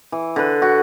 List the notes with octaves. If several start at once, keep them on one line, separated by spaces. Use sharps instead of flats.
E3
D3 B4
F#4